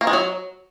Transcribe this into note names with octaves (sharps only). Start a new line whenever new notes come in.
A#3
G#3
F#3